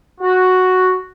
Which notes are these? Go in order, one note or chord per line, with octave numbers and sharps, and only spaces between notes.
F#4